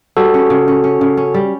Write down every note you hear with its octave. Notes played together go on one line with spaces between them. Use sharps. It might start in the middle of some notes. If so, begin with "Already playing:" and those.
G3 F#4 A4
C#4
C#3
C#4
C#4
C#3
C#4
G3